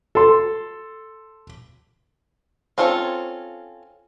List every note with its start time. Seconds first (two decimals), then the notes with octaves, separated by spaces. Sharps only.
0.15 A4 C6
2.78 C4 C#4 F4 A4 C#5